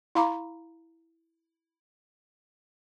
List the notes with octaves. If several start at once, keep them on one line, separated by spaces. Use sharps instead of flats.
E4 F5 A#5 B5 D6